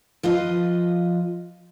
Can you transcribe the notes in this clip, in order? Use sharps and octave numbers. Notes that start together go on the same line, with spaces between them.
F3 F4 B4 D#5